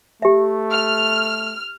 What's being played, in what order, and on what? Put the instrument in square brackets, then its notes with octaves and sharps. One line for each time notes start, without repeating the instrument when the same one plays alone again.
[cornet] A3 [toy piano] G4 E5
[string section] F6